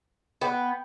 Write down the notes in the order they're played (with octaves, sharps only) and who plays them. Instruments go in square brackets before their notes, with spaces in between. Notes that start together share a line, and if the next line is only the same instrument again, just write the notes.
[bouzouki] B3 [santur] G5